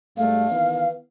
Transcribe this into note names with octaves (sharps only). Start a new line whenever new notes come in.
G#2 G3 A3 F5
D#3 E3 B3